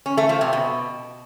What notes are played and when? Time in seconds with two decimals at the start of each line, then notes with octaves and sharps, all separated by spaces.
0.06 C#4
0.17 A3
0.29 F3
0.41 C3
0.53 B2